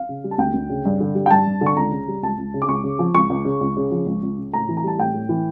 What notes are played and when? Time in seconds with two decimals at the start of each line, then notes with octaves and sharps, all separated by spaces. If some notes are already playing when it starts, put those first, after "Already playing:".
Already playing: F5
0.09 C#3
0.24 G3
0.31 A5
0.38 D2 G5
0.54 D2
0.69 C#3
0.85 G2
1.00 D3
1.15 G3
1.26 G5
1.31 G2 A5
1.46 G2
1.61 D3
1.66 C#6
1.77 C#2 A#5
1.92 C#3
2.08 G3
2.23 C#2 A5
2.38 C#2
2.54 C#3
2.62 D6
2.68 C#2 C#6
2.84 C#3
2.99 F3
3.14 C#2 C#6
3.30 C#2
3.45 C#3
3.61 C#2
3.77 C#3
3.91 F3
4.06 C#2
4.23 C#2
4.38 C#3
4.53 A2 A#5
4.69 E3
4.77 A#5
4.84 G3 A5
4.98 A2 G5
5.14 A2
5.29 E3